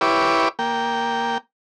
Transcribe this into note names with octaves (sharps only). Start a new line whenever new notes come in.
E4 G4 B4 C#5 D6
A#3 G5